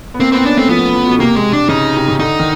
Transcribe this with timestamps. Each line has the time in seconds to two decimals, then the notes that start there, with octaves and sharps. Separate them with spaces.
0.14 B3
0.20 A#3 C4
0.32 B3 C4
0.45 C#4 D4
0.57 A3 C4
0.69 F3 B3
0.95 F3
1.07 B2
1.19 C3 A#3
1.36 G#3
1.53 D4
1.69 C#3 D#4
1.97 C3
2.08 C#3
2.19 D3 D#4
2.40 D#3